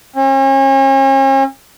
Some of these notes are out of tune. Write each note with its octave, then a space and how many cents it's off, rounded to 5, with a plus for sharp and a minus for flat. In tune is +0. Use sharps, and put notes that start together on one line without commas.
C#4 -40